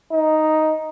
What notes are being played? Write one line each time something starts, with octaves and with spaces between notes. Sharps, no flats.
D#4